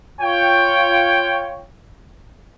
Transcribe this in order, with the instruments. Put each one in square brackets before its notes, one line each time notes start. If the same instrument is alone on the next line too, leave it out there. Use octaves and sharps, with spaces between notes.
[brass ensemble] F4 C#5 G5